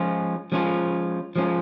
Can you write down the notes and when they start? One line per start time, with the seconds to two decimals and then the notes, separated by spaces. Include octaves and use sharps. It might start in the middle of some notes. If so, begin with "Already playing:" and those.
Already playing: F3 G#3 C#4 F4
0.52 F3 G#3 C#4 F4
1.36 F3 G#3 C#4 F4